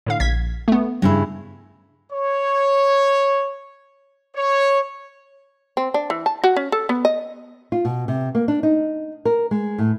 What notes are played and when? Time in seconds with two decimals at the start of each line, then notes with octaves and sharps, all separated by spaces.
0.06 A2 D3 F5
0.20 A#1 G#6 B6
0.68 A3 B3
1.02 G2 C#3 E4
2.13 C#5
4.36 C#5
5.77 C4
5.94 D4
6.10 E3
6.26 A5
6.44 F#4
6.56 C#4
6.72 A4
6.89 B3
7.05 D#5
7.72 F4
7.85 B2
8.08 C3
8.35 A#3
8.48 D4
8.63 D#4
9.25 A#4
9.51 G#3
9.78 A2